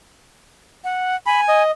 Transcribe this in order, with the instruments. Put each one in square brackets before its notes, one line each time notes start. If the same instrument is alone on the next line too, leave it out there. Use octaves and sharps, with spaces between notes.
[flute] F#5
[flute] G#5 [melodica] B5
[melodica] D#5